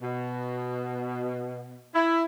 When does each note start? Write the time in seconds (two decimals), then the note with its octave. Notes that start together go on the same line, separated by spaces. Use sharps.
0.02 B2
1.94 E4